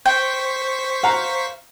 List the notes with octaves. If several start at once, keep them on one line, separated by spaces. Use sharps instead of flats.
C5 G5 C#6 B6
F5 F#5 A#5